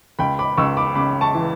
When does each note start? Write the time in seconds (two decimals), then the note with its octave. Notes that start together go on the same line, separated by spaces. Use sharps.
0.19 C#2 G5 B5
0.39 B5 D6
0.57 C#2 C#6 E6
0.77 B5 D6
0.95 C#3 B5 D6
1.21 A5 C#6
1.35 E3